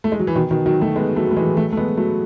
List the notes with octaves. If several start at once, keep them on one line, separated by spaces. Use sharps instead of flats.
A3
G#3
F#3
E3
B2 D#3
B2 D#3
D#3 F#3
F#3 A3
G#3 B3
F#3 A3
A3
E3 G#3
F#3 A3
A3
G#3 B3
F#3 A3